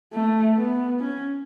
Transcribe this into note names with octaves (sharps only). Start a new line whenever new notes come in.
A3
B3
C#4